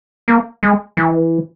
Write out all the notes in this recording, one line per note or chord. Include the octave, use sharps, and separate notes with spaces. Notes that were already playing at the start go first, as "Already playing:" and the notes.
A#3
G#3
E3